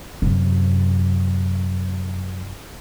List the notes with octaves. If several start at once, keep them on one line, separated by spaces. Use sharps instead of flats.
F#2 C3